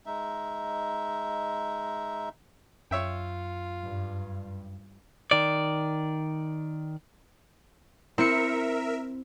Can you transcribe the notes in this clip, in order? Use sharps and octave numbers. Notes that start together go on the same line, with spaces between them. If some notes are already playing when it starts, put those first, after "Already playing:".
G#3 D#4 E5
F#2 F4 C#5 E5 G5
G2
D#3 D5
C4 E4 A#4 E5 C#7